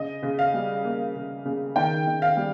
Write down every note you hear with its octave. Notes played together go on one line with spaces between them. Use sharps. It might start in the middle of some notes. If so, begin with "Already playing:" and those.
Already playing: C#3 D#5
C#3
F5
G3
A#3
C#3
C#3
D#3 G5
D#3
F5
G3